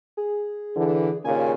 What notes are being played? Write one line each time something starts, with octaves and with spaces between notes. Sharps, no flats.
G#4
D3 E3
D#2 A#2 C#3 G#5